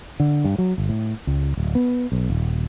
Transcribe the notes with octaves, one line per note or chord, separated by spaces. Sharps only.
D3
G2
F#3
G1
A2
C#2
D1
B3
B1
D#1